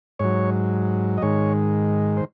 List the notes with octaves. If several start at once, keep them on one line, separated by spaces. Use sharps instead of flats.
G#2 F#3 C#5
D#5
G#2 D#3 G#3 C#5
C5